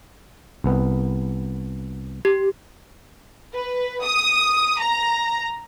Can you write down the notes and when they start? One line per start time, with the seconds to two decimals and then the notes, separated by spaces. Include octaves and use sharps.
0.64 C2 B3
2.25 G4
3.54 B4
4.03 D#6
4.80 A#5